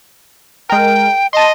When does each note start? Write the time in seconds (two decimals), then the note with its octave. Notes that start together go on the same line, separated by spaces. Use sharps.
0.69 G#3 A#4 G5
1.33 D#5 A5 C6